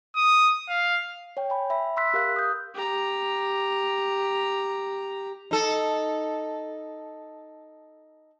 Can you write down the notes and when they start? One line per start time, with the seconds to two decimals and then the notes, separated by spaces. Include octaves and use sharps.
0.16 D#6
0.69 F5
1.37 C#5 G5
1.50 G5 G#5 B5
1.70 E5 B5
1.97 B5 C6 E6 F#6 B6
2.14 G4 A#4 F5 F#6
2.36 D#6 G6
2.74 G4 A#5
5.51 D#4 A4